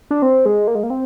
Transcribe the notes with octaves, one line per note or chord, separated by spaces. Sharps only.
D4
C4
G#3
A#3
G#3
A#3
C4